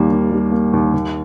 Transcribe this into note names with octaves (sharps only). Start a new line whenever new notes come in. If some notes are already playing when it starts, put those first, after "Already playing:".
Already playing: D#2 D#3 G3 A#3
D#3
G3
A#3
D#2
D#2